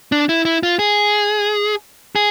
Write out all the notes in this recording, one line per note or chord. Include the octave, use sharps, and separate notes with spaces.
D4
E4
E4
F4
G#4
G#4